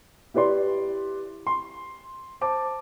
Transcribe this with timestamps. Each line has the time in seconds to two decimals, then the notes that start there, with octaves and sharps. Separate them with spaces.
0.34 E4 G4 B4 D5 C6
1.47 C6
2.41 C5 A5 D6